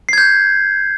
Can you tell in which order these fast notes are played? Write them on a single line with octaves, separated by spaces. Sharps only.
C7 G#6 G6